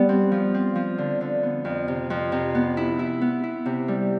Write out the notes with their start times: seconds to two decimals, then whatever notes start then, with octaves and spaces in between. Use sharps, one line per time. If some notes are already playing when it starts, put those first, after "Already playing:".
Already playing: G3 B3
0.09 C4
0.32 F3
0.54 C4
0.75 F3
0.98 D3
1.21 D3
1.43 B3
1.65 F2
1.88 C3
2.10 F2
2.32 C3
2.55 B3
2.77 E4
2.99 E4
3.21 B3
3.44 E4
3.66 C3
3.88 G3